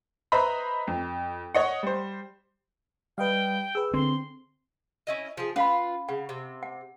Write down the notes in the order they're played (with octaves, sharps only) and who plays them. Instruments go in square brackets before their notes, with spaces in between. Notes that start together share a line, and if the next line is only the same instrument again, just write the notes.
[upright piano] B4 C5 D#5 E5 A#5 B5
F2
C#5 D#5 F#5
G3 C5
[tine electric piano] G3 [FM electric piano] B4 D#5 F5 [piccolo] G5
[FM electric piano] G#4 B4 [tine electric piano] E6
[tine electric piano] D3 [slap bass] C4 [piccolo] C6
[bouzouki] C#4 E4 D#5
F3 G#4
[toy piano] C#4 F5 B5 [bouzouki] F4 B4
[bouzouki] C#3 [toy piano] F#5
[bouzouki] C3
[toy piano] F#5